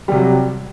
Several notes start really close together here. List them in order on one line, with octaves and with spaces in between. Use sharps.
G3 C3 F#3